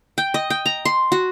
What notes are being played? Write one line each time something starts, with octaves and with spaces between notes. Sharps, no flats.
G5
D#5
G5
A#5
C6
F#4